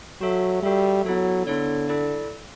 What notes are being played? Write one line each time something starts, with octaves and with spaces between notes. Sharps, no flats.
F#3 F#4 A4 E5
G3 F#4 A4 E5
F#3 B3 E4 A4 C#5
D3 B3 E4 A4 C#5
E4 A4 D5